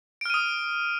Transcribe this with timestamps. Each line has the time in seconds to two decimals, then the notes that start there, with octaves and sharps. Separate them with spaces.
0.21 D7
0.25 F6
0.30 D#7
0.34 D#6